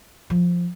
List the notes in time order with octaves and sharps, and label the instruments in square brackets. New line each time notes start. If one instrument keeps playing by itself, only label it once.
[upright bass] F3